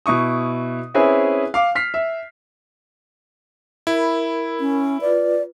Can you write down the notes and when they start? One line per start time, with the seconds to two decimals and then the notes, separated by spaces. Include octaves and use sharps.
0.06 B2 E4 C#6 D#6
0.94 C4 C#4 E4 G#4 B4 E5
1.54 F5 D6
1.75 F6 B6 C7
1.94 E5
3.87 E4 A#4 B5
4.60 C#4
5.01 F4 B4 D5